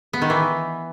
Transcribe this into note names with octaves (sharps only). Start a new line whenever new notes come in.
B3
D#3
E3